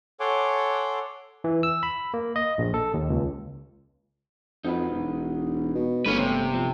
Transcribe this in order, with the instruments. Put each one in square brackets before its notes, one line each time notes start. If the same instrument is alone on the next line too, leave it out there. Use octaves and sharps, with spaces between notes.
[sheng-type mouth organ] A4 C#5 F#5 G#5 C6 D6
[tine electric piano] E3
E6
B5
A#3
D#5
A#1
A4
D#2
C#2
[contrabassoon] F2 [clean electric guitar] D#4 F#4 B4
[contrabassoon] E1
B2
[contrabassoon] G1 [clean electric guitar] A3 A#3 [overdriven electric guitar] C#4 B4
[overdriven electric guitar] C3
[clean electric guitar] F3 C4